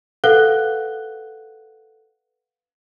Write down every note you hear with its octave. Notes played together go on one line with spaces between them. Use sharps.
A4 B4 F5 F#5 F#6 G7